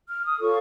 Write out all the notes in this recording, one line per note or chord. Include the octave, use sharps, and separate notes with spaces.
F6
D#6
F4 A4 C#5 C#6